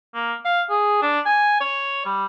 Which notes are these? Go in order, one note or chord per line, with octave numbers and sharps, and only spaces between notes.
A#3
F5
G#4
D4
G#5
C#5
G3